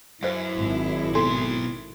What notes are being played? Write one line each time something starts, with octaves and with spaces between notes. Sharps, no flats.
F#2 E4 B4 C5 F5
G#1
B2 F#3 A4 G#5 C6